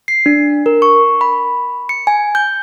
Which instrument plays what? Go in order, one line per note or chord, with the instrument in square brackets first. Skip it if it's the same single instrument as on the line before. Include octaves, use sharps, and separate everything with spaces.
[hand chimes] C7
D4
A#4
C#6
B5
C#7
G#5
G6